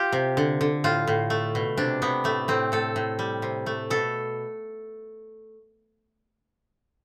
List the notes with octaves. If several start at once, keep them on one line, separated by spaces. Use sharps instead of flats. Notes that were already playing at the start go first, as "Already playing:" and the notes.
Already playing: F4 G4
C3
D3
D3
A2 F4
A2
A3
B2
C3 D4
C3 B3
A2 A3
A2 C4
A2 A4
A2
G3
C3
A3
B2 A4